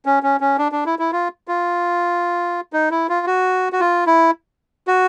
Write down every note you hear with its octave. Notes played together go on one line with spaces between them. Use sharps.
C#4
C#4
C#4
D4
D4
E4
E4
F4
F4
D#4
E4
F4
F#4
F#4
F4
E4
F#4